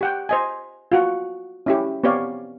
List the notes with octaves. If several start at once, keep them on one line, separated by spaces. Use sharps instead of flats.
G4 F#5 G5
C5 D#5 G#5
F4 F#4 F#5
C#4 E4 G4
B3 C4 G4 C#5 D5 F5